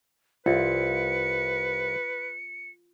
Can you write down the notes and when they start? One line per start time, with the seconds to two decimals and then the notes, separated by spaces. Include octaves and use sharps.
0.46 C2 F4 B4 C#7